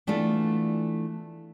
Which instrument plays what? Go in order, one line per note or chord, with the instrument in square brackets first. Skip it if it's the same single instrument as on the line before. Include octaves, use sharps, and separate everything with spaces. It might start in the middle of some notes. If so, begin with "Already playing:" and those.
[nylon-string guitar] E3 A3 B3 D4 F4 A4